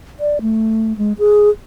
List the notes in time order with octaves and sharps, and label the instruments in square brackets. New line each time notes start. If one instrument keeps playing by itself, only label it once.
[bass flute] D5
A3
G#3
G#4